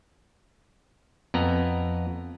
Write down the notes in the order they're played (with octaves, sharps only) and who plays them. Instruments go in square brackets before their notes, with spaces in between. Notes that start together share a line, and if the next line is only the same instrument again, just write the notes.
[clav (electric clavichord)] F2 B3 A#5